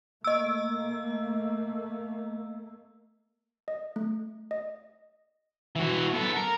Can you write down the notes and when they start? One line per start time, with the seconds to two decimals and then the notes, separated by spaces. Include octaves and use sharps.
0.24 A3 A#3 D#5 E6
3.68 D#5
3.96 A3
4.51 D#5
5.76 E3 F#4
6.14 B3 A4
6.36 A#4